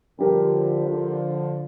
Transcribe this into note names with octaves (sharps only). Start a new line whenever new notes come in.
D3 F3 G3 D4 G4 A#4
D3 F3